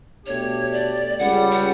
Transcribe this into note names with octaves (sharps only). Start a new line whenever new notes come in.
B2 A3 D4 G4 C#5
D5
C#2 C#3 G3 F#5
F#5